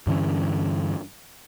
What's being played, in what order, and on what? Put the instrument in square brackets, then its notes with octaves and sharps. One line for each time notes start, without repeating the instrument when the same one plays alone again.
[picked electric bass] G2 D3 E3 C#4